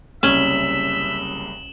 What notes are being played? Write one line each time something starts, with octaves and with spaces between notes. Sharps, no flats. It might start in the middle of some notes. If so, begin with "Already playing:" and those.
F#1 C2 C#4 E5 E7 F#7 G7